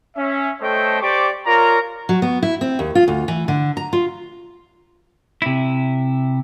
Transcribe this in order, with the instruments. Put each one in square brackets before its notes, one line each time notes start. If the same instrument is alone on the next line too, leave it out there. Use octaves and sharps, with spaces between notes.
[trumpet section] C#4 E5
A3 A4 C5 C#5 D#5 G5
G4 C5 D5 C#6 D6
F4 A#4 C#5 D5 A#5
[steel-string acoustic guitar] F#3
B3
E4
C4
D#2
F4
D2
E3
D3
A#5
F4
[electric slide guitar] C3 E4